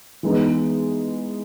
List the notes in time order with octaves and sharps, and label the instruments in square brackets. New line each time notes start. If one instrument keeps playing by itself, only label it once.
[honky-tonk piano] E3 G#3 B3 D#4